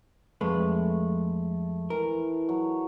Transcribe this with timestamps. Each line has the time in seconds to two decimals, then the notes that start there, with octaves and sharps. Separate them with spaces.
0.41 F2 G#3 A3 B4
1.90 E3 A#4
2.49 F#3